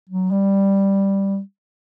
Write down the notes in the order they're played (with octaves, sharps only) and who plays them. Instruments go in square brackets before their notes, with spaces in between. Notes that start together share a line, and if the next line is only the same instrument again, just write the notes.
[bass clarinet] F#3
G3